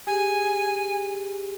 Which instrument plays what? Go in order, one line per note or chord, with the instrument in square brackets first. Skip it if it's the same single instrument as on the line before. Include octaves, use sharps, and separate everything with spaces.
[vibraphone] G4 G#4 [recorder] G#5